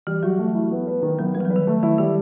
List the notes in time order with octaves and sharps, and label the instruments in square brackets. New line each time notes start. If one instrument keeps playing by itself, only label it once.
[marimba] E3 [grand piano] G3
[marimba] F#3 [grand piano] F#4
[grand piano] A3
E4
B3
B4
D#3
[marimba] F#3 [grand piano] B3
[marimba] G3 [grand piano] B3
[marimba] E3
F#3
[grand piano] B4
[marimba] D#3
[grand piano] A3
[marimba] D#3 [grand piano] E4
[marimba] D#3 [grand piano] G3